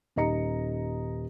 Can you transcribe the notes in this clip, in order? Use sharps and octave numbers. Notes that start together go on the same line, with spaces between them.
D#1 D#4 G4 D#5 A#5 C#7